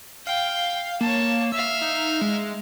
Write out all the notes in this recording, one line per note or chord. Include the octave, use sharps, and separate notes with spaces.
F5 G5
A#3 C#5 A5
E5 F5 E6
D#4
G#3